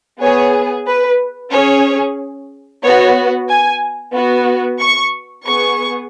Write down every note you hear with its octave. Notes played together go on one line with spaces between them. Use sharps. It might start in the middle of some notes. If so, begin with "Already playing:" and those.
B3 G#4 C#5
B4
C#4 G#4 C#5
B3 F#4 C#5
G#5
B3 F#4
C#6
B3 G#4 C#6